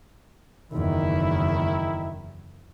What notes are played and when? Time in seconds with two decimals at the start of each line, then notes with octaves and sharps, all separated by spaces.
0.72 F#1 E2 D#3 E4